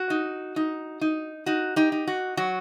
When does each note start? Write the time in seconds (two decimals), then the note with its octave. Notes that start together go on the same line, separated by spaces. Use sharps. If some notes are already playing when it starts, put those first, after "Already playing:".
Already playing: F#4
0.10 D#4
0.56 D#4
1.01 D#4
1.46 D#4 F#4
1.76 D#4 G4
1.92 D#4
2.07 F#4
2.37 F#3 F#4